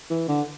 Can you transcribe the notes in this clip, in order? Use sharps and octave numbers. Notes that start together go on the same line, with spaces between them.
E3
D3